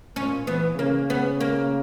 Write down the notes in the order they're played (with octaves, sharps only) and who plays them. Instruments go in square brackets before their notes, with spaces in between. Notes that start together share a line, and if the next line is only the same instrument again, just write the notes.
[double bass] A#2 [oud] C#4
[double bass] E3 [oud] B3
[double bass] C#3 [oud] A#3
[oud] B3
A#3